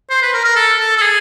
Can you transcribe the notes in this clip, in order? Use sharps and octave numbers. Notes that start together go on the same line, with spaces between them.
C5
B4
A#4
A#4
A4
A4
A4
G#4